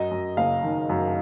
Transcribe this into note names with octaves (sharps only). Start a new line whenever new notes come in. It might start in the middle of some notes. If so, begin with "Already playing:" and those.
Already playing: F#2 D#5
F#2
F#1 F5
D#3
F#2